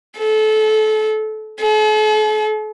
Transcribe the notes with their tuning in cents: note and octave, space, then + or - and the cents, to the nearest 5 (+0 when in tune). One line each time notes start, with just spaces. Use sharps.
A4 -25
A4 -45